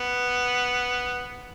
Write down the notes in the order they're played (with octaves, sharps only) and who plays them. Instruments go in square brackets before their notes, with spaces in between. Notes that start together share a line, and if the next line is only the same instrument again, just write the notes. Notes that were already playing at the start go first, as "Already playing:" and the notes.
Already playing: [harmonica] B3